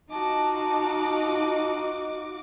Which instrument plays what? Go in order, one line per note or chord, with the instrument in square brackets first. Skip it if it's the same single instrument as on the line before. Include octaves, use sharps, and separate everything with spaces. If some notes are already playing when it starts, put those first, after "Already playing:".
[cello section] D#4 F4 [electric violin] F#4 D6 [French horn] D#5 [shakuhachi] A5